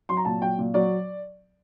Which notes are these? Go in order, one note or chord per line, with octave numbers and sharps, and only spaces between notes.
F#3 C6
A#5
A#2 A5
F#3 G5
A#2
F#3 D5